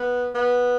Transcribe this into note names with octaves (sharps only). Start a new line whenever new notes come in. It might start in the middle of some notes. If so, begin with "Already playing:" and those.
Already playing: B3
B3